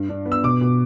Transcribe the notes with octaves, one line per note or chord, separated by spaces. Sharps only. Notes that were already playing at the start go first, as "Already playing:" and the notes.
Already playing: G2
D4
B3
E6
B2 D6
B2